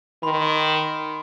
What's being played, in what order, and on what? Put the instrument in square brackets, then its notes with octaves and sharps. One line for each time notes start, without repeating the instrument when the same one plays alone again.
[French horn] D#3 [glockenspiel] B5 C6